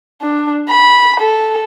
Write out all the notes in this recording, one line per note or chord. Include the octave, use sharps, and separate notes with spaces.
D4
B5
A4